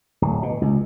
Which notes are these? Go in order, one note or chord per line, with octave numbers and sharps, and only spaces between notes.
D1
B2
C#2